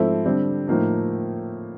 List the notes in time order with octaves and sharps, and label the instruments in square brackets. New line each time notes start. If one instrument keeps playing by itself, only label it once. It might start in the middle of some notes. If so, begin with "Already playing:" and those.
Already playing: [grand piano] G#2 F3 A3 C4 E4
D3 G3 C4
A2 F3 A#3 D#4